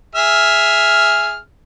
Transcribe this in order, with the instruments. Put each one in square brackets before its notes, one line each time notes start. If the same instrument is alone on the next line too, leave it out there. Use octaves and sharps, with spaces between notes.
[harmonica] G#4 E5 F6